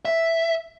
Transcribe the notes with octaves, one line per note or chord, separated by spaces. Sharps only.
E5